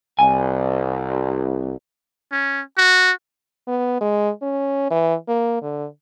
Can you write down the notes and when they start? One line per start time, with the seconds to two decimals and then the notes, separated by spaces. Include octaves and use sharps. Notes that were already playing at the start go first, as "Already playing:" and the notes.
0.19 C2 G#5
2.32 C#4
2.78 F#4
3.68 B3
4.01 G#3
4.42 C#4
4.91 E3
5.28 A#3
5.62 D3